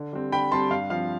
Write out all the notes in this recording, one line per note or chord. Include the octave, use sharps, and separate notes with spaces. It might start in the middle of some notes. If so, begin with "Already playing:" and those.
Already playing: D3
G3 C4
D3 G5 B5
G3 C4 A5 C6
G2 F5
F3 C4 F5